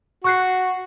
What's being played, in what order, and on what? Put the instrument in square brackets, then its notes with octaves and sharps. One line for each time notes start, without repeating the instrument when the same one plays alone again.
[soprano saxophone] F#4 [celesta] C#6 F#6 C7